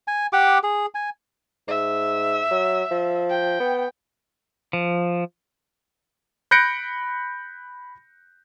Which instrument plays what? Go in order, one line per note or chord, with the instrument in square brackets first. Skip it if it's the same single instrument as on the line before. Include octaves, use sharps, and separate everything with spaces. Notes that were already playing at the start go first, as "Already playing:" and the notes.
[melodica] G#5
G4 F#5 D6
G#4
G#5
[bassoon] G#2 [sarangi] E5
[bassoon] F#3
F3
[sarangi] G5
[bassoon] B3
[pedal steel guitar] F3
[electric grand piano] B5 F#6 G6 A#6 C#7 D7